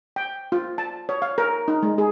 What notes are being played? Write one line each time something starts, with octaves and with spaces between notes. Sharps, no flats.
G5
F4
A5
C#5
F5
A#4
D#4
G#3
G#4